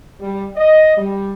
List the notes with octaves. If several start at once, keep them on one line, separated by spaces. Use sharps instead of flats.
G3
D#5
G3